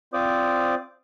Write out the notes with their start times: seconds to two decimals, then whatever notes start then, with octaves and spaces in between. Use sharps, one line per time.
0.14 C4 F4 C5 D5 D6 D#6